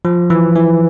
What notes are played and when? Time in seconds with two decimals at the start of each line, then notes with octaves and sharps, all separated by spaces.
0.05 F3
0.30 E3
0.55 E3